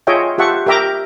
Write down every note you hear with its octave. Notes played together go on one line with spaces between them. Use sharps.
F4 G#4 C#5 D#5 E5 G5
F4 G4 E5 F#5 A5 C#6
G4 A#4 E5 G5 A#5 D6